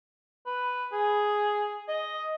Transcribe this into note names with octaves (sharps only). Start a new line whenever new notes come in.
B4
G#4
D#5